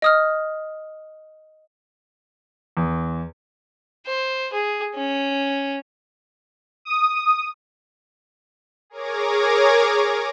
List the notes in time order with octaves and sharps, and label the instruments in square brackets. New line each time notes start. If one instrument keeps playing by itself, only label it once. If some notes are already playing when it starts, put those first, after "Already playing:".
[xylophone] D#5 D#6 F6
[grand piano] E2
[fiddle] C5
G#4
C#4
[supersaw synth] D#6
G#4 A#4 C#5 D6 G#6 A#6